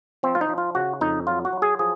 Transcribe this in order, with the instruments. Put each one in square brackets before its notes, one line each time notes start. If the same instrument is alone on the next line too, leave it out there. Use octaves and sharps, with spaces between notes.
[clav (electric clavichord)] F3 C4
F4
D#4
F3
F4
C#3 F#4
F2 D#4
F#3 F4
F#4
F#3
G#4
F3 G#4